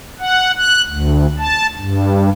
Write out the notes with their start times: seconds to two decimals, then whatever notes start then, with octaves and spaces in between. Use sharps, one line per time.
0.20 F#5
0.58 F#6
0.88 D2
1.39 A5
1.79 G2